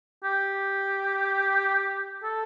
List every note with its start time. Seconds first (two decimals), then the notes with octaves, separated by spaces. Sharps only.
0.24 G4
2.23 A4